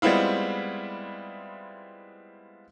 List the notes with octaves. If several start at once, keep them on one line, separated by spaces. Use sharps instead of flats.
G3 G#3 B3 C4 E4 F4